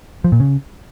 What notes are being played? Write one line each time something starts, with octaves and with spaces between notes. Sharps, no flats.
F3
A#2
C#3